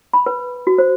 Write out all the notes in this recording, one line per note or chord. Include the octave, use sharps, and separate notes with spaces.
B5
B4
F#4
C5